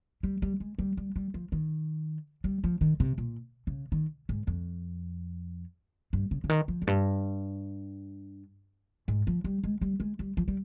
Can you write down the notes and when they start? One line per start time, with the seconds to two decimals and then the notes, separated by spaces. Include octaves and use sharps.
0.23 G3
0.42 G3
0.60 G#3
0.79 G3
0.97 G3
1.16 G3
1.34 F3
1.52 D#3
2.44 G3
2.64 F3
2.81 D#3
3.00 C3
3.18 A#2
3.67 C#3
3.92 D#3
4.29 G#2
4.47 F2
6.13 G2
6.31 C#3
6.44 C#3
6.49 D#3
6.68 F3
6.82 F2
6.87 G2
9.08 G#2
9.27 F3
9.44 G3
9.64 G#3
9.81 G3
10.00 G#3
10.19 G3
10.37 F3
10.48 G3